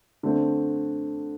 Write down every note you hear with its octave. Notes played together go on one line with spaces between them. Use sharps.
D3 A3 C4